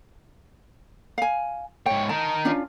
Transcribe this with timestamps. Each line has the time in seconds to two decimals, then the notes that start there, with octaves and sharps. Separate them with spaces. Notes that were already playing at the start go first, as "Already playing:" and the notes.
1.18 F5 G#5
1.86 G#2 C#5 G5
2.09 D#4 A#4 A5
2.45 C#4 D4 F4